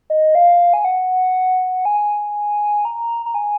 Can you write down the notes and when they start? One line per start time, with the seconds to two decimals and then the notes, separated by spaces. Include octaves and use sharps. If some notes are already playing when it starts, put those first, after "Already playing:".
0.10 D#5
0.35 F5
0.74 G#5
0.85 F#5
1.85 G#5
2.85 A#5
3.26 A#5
3.35 G#5